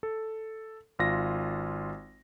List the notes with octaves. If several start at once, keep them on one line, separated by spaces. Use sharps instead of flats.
A4
G#1 F4 A#6